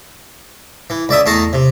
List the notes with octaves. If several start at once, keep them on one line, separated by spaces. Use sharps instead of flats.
E3
C#2 D5 E5 D#6
E2 A3 G#4 A5 A#5
C3